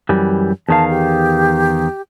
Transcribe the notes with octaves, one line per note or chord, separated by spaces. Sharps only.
F#2 E3 G3
E2 D#3 F5 A5
G4